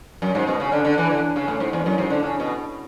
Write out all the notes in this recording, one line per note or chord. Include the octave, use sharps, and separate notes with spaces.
F#2
G#2
B2
C#3
D3
D3
E3
D3
C#3
A2
G#2
E2
F#2
G#2
D3
C#3
B2